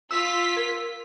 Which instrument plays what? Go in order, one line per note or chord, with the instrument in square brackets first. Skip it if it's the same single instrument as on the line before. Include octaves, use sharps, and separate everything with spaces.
[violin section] F4 B6 [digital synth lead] E6
[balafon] A#4